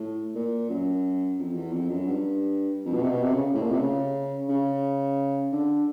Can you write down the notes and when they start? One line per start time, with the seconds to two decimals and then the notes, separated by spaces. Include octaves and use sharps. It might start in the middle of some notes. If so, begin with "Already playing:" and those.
Already playing: A2
0.35 A#2
0.69 F#2
1.39 F2
1.55 E2
1.72 F2
1.90 F#2
2.07 G2
2.85 F2
2.94 B2
3.02 C3
3.10 B2
3.22 C3
3.34 C#3
3.54 A2
3.62 A#2
3.71 C3
3.80 C#3
4.49 C#3
5.52 D3